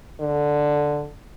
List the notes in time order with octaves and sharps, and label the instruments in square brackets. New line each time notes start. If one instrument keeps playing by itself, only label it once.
[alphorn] D3